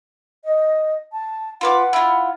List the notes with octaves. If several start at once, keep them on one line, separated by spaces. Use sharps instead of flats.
D#5
A5
F4 B4 F#5 D6
E4 F4